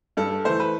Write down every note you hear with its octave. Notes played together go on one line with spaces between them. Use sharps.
G2 A4
A4
E3 A3 C5
B4